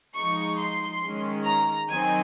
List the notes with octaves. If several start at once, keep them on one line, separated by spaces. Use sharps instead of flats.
F3 G#3 D#4 C#6
C6
D#3 G#3 C#4
A#5
D#3 F#3 C4 D#4 G#5